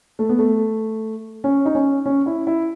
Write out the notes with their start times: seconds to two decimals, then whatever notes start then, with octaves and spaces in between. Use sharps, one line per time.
0.19 A3
0.29 B3
0.39 A3
1.44 C#4
1.66 D#4
1.75 C#4
2.06 C#4
2.26 E4
2.47 E4